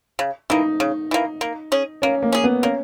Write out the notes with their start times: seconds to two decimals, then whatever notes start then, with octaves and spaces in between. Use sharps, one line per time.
0.19 C#3
0.50 E3 A#3 D#4
0.80 C#3
1.11 E3 A#3
1.41 A#3
1.72 C#4 G#4
2.02 A#3 C#4
2.22 A#3
2.32 C#4 G#4
2.44 B3
2.63 A#3 C#4